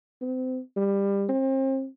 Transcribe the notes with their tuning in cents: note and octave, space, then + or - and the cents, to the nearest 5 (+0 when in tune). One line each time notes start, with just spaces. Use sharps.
C4 -30
G3 +20
C4 +35